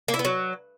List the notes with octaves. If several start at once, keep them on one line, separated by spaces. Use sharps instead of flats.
A#3
E4
B3
F#3